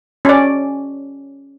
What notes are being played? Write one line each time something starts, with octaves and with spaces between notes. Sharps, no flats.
C#4 D5